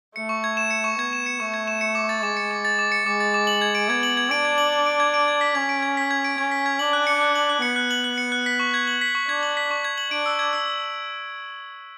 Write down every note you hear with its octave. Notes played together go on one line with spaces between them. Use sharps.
A3 C#7
C#6
G#6
E7
C#7
C#6
B3 G#6
E7
C#7
A3 C#6
G#6
E7
C#7
D6
A6
G#3 D6
C#7
D6
A6
D6
C#7
G#3 D6
A6
D6
F#7
G#6
D7
B3 G#6
F#7
G#6
D4 D7
G#6
F#7
G#6
D7
G#6
D7
G#6
B6
C#4 G#6
D7
G#6
B6
G#6
D7
C#4 G#6
B6
G#6
D4 F#7
F#6
C#7
F#6
F#7
F#6
B3 C#7
F#6
F#7
F#6
C#7
F#6
B6
C#6
G#6
F#7
B6
C#6
D4 G#6
F#7
B6
C#6
G#6
F#7
D4 D7
E6
G#6
E6